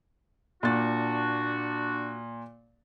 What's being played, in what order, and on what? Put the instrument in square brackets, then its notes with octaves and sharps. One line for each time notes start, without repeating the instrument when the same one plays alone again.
[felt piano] A#2 A6 [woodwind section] D4 F#4